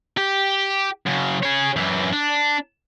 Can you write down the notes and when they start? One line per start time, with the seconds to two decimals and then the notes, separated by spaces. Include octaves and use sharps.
0.18 G4
1.07 F#2 C#3
1.43 G#4 C#5
1.76 F#2 E3
2.12 D4